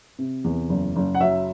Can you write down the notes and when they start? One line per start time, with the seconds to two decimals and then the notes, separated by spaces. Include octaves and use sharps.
0.19 C3
0.44 E2
0.69 F#1
0.96 F#1
1.15 F#5
1.20 F#3 E5